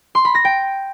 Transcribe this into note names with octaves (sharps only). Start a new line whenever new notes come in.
C6
B5
A#6
G5